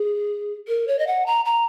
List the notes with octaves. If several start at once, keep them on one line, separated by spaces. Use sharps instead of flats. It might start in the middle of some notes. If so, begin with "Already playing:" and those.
Already playing: G#4
A#4
C#5
D#5
F#5
A#5
A#5